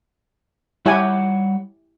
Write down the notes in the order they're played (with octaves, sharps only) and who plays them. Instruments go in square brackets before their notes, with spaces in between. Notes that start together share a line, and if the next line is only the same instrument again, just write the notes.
[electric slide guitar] G3 C#5 F#5 [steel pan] E4 G4 G#5